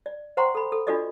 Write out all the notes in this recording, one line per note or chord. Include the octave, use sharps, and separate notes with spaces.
D5
C5 F#5 G5 A#5 C6 C#6
A4 B5
A4
D4 F4 F#4 A4 D5 D#5